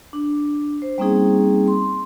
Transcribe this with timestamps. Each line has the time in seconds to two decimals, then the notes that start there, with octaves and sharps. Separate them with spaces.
0.13 D4
0.82 C5
0.98 G3 A#3 C4 C#4 D#4 G#4
1.68 C6